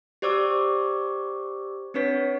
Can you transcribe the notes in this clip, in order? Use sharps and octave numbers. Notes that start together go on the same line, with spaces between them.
G4 C5 D5 C#6 D6 E6
C4 D4 B4 C#5 B6